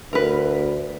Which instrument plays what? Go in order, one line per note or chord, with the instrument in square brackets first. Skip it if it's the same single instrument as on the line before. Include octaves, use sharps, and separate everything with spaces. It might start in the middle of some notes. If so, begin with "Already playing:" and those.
[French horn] D2 [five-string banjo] A#4 B4